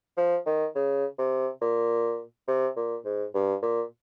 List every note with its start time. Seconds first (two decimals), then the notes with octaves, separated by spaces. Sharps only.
0.17 F3
0.46 D#3
0.75 C#3
1.18 C3
1.61 A#2
2.48 C3
2.77 A#2
3.05 G#2
3.35 G2
3.62 A#2